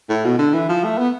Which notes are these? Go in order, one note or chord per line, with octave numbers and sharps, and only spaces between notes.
A2
B2
D3
E3
F3
A3
B3